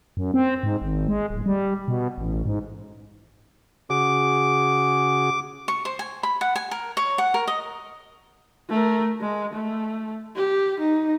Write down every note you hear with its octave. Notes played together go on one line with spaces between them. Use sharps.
F#2
C4
G#2
G#1
G#3
D1
G3
B2
A1
G#2
C#3 F#4 G#4 D6
C#6
C5
G#5
B5
F#5
G#5
A#4
C#5
F#5
A#4
D#5
A3 A#4
G#3
A3
G4
D#4